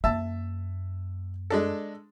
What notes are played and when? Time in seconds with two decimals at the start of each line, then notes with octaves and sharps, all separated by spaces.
0.04 F#2 A#3 E5 A5
1.50 G#3 D4 A4